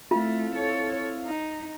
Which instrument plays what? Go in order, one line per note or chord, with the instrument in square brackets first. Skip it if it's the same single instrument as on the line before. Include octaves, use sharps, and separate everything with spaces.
[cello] A3 [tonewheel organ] C4 E4 F5 [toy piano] F4
[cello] A4 C#5
D#4